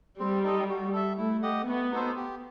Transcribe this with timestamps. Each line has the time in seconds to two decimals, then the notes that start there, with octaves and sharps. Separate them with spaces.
0.19 G3 C4
0.44 D#4 A4 D#5
0.69 F#4
0.93 A4 E5
1.17 A3 E4
1.43 G4 D#5 F#5
1.67 A3 B3
1.91 D#4 F#4 A4 C5
2.16 G4